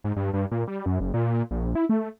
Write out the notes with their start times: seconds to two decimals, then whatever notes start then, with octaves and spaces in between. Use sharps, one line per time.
0.04 G#2
0.16 G2
0.34 G2
0.51 A#2
0.67 G3
0.86 F#2
1.00 F#1
1.14 A#2
1.51 A#1
1.75 E4
1.89 A3